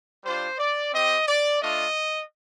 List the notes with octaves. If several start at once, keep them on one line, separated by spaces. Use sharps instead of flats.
G3 D4 F4 C5
D5
C4 G4 D#5
D5
A3 D4 F4 D#5